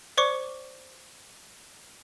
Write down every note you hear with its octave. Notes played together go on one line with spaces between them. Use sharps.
C5 D5 C#6 D6 C#7